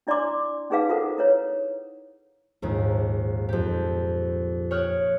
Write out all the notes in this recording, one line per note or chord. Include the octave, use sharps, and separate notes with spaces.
D4 E4 D5 A#5 C6 D6
C#4 D#4 G#4 B4 F5 D6
F4 A4 A#4 C5 F#5
E4 B4 C#5
A#1 D#2 G#2
F2 G4
C#5 G5 D#6 F6 F#6 G#6